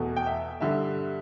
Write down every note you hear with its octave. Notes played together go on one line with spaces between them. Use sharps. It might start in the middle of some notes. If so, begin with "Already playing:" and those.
Already playing: E2 B2 A3
G5
E5
G2 D3 G3 E5